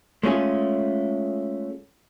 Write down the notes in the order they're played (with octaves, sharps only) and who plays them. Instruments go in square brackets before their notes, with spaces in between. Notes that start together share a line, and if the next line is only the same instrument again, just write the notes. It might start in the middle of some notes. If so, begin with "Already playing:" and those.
[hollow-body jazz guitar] G#3 A3 C#4 F4 G#4